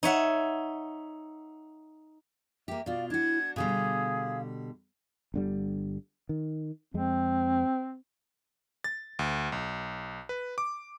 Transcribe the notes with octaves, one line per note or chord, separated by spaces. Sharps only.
D#4 C#5 E5 F#5
A#3 G4 E5
B2 F4 D5 F5
D4 E4 F#4 G#6
B2 D3 G3 G#4 F5
G1 D3 G3
D#3
F2 G#3 C4
A6
D2
B1
B4
D6